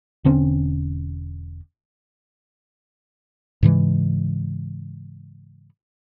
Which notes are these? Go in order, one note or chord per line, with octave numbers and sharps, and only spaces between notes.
E1 D3 C4 C#4
G#2 C#3 E3 G#3